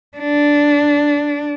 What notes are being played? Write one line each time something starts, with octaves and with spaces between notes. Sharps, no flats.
D4